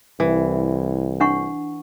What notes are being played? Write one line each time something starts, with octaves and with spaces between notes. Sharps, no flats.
C2 E3
D4 F#5 C#6